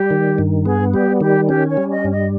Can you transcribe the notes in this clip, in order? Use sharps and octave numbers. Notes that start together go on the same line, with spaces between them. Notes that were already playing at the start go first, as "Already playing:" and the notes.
Already playing: G3 G4
D#3
G2
B3 G#4
G3 G4
D#3 G4
C#4 G4
C#5
G3
D#5
G2
D#5